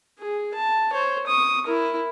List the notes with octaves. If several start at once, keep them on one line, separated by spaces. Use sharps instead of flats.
G#4
A5
C5 C#5
C#6 D#6
E4 A#4